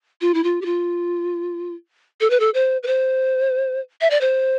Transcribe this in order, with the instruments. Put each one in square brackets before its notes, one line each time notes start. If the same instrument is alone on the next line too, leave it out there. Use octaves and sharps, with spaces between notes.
[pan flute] F4
E4
F4
G4
F4
A4
B4
A4
C5
B4
C5
E5
D5
C5